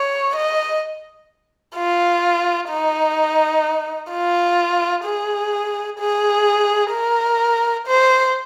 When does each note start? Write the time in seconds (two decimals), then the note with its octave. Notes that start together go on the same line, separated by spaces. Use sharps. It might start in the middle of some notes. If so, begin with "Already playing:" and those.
Already playing: C#5
0.36 D#5
1.76 F4
2.70 D#4
4.11 F4
5.05 G#4
5.99 G#4
6.93 A#4
7.87 C5